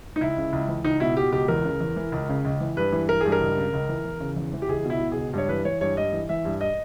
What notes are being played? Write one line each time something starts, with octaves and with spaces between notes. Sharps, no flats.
D#4
C#2 E4
C#3
C#2
E3
C#2 D#4
B2 E4
B2 G4
C#2 G4
E2 A#4
C#3
E2
E3
C#2
C#3
C#2
E3
G2 B4
E3
E3 A#4
G2 G#4
A#4
C#2
C#3
C#2
E3
E2
C#3
E2
E3
G4
C#2 G#4
B2
E4
B2
C#2 G#4
G2 C#5
E3 B4
E3 C#5
G2 C#5
G2 D#5
E3
E3 E5
G2
D#5